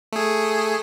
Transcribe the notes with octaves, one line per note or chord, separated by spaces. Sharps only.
A3 G#4